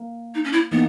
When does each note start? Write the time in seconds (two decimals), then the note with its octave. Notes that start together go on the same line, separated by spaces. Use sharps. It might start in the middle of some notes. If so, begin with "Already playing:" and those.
Already playing: A#3
0.35 D#4
0.44 C#4
0.53 E4
0.72 E3 A#3 B3 D#4